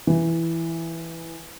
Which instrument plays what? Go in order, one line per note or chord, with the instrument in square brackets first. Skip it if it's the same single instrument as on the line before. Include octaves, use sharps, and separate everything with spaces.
[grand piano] E3